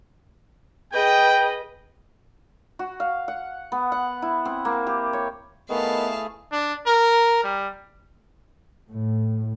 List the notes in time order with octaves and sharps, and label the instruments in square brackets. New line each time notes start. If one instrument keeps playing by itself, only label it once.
[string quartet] G#4 B4 D#5 [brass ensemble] G5
[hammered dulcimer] F#4
F5
F#5
B3
F#5
E4
C4
A#3
G4
C#5
[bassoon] D#3 [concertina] A3 E4 G#4 [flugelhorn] B3 [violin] F5 A5
[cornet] D4
A#4
G3
[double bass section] A2